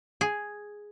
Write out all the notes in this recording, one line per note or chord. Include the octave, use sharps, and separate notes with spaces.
G#4